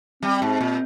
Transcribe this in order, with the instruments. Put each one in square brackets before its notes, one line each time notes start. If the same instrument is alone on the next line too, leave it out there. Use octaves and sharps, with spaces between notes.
[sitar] G3 [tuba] C4
[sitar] G#2
A#2